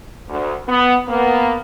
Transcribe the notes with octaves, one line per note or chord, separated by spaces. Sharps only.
D2
B3
A#3 B3